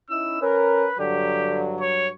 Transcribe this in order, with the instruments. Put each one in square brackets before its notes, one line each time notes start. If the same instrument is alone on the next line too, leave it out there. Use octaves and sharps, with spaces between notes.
[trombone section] C#4 D#4 E4 [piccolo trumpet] E6
[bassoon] C#4 [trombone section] A#4 [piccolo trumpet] B4
[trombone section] G2 F#3 [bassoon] D3 [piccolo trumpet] G4
[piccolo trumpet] C#5